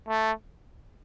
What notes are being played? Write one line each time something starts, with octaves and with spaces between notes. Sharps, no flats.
A3